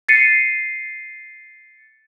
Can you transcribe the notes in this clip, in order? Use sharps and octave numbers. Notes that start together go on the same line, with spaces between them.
A6 C7 C#7 D#7